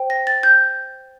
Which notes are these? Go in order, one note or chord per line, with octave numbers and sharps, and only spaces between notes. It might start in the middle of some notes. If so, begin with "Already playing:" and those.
Already playing: C5 G5
A#6
A6
G6